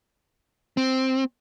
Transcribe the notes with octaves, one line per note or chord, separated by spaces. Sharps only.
C4